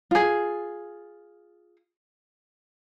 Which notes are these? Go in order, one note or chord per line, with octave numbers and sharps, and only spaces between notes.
F4 G#4